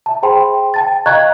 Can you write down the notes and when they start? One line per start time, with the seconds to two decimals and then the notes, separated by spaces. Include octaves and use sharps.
0.06 E5 A5
0.23 G#4 C5 G5 B5 C6
0.74 G5 A5 A6
1.06 D#5 F5 A#5 C#6 F#6 G#6